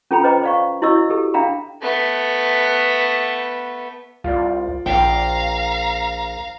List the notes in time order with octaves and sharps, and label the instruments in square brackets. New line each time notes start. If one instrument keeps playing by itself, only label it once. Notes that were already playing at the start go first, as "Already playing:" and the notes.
[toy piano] C#4 F4 A4 G5 A#5 B5
B4 C5 D#5 G5 A#5 D6
D5 F5 C#6
E4 F#4 C#5 D#5 C#6 E6
G4 A4
D4 E5 F5 G5 A#5 B5
[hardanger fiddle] A3 B3
[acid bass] C2 [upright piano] F4 D5
[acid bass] A#1 [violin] F5 A#5 [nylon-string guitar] G5